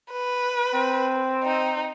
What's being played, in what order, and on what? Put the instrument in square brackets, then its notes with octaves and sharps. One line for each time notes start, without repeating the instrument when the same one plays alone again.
[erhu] B4
[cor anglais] C4
[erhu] D#4